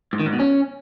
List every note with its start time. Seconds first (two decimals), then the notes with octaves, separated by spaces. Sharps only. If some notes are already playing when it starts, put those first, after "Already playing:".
0.13 G#2
0.20 D#3
0.26 G#2
0.33 B2
0.40 C#4